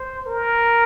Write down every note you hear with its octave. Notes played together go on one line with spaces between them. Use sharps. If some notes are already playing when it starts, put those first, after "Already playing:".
Already playing: C5
A#4